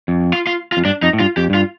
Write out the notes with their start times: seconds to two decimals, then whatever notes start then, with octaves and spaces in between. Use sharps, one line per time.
0.08 F2
0.33 F4
0.47 F4
0.72 F4
0.77 F2
0.85 G2 D4
1.02 F2 D#4
1.13 A2
1.19 G2 F4
1.37 F2 G4
1.50 G2 F4